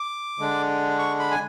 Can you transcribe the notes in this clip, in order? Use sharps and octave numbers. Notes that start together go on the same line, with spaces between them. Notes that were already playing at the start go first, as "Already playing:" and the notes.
Already playing: D6
D3 G#3 D4
C#6
B5
G#5